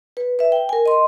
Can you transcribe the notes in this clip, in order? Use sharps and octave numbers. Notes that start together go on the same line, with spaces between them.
B4
B4 E5
G5
A#4 G#5
D#5 C6